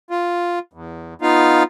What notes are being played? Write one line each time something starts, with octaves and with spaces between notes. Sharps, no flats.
F4
E2
B3 D#4 F4 F5